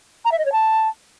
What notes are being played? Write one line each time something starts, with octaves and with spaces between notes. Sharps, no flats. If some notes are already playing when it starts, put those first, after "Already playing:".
A#5
E5
D#5
C#5
A5